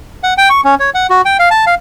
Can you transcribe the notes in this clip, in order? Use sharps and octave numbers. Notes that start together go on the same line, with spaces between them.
F#5
G5
C#6
C#4
C#5
F#5
F#4
G5
F5
A5
F5